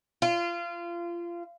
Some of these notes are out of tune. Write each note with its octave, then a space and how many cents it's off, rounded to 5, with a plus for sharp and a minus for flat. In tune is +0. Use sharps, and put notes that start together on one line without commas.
F4 -25